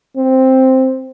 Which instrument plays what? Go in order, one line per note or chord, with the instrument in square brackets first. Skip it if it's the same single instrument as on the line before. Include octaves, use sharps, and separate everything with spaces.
[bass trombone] C4